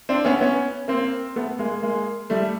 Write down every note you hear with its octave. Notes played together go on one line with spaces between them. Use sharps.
C4 D4
B3 C#4
B3 C#4
A#3 C4
A3 B3
G#3 A#3
G#3 A#3
G3 A3